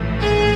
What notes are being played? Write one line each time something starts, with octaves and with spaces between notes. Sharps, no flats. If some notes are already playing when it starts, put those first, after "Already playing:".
Already playing: A#1 A2 E3 A3
G#4